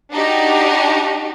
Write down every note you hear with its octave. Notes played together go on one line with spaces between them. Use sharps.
D4 D#4 F#4 G4